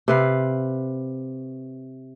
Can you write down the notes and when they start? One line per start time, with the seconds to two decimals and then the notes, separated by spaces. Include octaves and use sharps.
0.08 C3 B4 F5